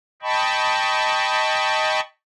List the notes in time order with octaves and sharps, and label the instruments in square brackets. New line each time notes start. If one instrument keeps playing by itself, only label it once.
[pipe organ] D#5 G5 A5 B5 C#6